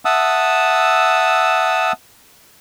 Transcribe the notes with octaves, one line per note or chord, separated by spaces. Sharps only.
E5 F#5 A5 D#6 E6